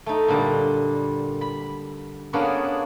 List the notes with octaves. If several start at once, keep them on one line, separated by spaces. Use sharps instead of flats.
A3 D#4
A#2 D3 G3
B5
A#3 B3 C#4 D4 G#4 C#5